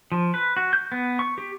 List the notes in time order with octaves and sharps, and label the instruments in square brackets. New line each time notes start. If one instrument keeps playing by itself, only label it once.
[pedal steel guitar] F3
B4
F#4
G6
B3
C#6
G4